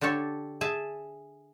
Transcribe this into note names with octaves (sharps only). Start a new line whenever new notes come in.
D3 D4 G4 A4 C#5
G#4 E5 A5